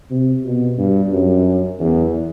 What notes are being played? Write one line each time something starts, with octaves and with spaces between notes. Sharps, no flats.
C3
B2
G2
F#2
E2